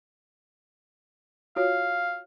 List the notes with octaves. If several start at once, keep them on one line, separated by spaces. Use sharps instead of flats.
F4 F#4 C#5 F5